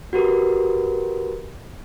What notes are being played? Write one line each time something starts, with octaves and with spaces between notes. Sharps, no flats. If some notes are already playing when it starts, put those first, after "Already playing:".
F#4 G4 A#4 B4